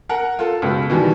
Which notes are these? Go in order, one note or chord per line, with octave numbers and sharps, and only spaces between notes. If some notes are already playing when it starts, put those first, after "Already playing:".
A#4 F#5
F4 A4
C#2 B2
B2 D#3 E3 G3